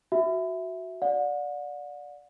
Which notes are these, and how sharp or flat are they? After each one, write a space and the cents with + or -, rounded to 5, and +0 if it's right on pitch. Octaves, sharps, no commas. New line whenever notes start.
F#4 +0 E5 +0
D5 -5 F#5 -40